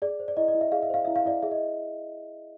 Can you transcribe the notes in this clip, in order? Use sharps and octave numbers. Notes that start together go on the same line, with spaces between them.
G#4 D5
C5
D5
E4 D#5
D#5
E4
E5
G#4 F5
E5
C5 F5
E4 E5
F5
E4 D5 E5
G#4 E5
D#5